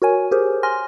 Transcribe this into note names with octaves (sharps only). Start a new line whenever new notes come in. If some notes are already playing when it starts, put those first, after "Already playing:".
F#4 A#4 C#5 G#5
G4 G#4 A#4 C5
G#5 C6 F6 A#6